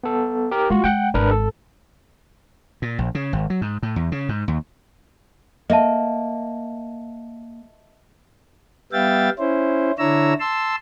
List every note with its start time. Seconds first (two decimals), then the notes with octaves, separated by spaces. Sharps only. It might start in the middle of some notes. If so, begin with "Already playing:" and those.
0.04 B3 A4
0.51 G4 A#4
0.70 G#3 A#3 F4 F#4
0.84 G#3 F#5 G5
1.14 G#1 D4 A#4 B4
1.31 A4
2.82 A#2
2.99 A#1
3.15 C#3
3.33 G#1
3.50 F#3
3.61 G#2
3.83 A2
3.96 E2
4.12 C#3
4.29 G#2
4.48 D#2
5.70 A#3 D#5 E5 A5
8.93 G3 B3 E5 F5 G5 A6
9.39 C#4 E4 C5
9.99 D3 D4 E4 C#5 A#5 E6
10.40 A5 C6 E6